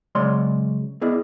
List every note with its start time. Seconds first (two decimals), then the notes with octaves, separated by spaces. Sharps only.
0.15 C#3 F#3 G#3 C#5 D5 C6
1.01 B3 E4 G#4 D5 D#5